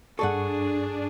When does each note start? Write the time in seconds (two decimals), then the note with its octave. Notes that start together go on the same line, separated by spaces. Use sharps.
0.19 G2 D4 G#4 A4 D5 F#5 C#6